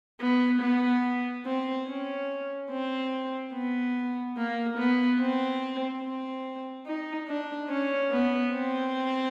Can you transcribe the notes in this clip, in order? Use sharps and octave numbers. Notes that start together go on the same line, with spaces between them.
B3
B3
C4
C#4
C4
B3
A#3
B3
C4
C4
D#4
D4
C#4
B3
C4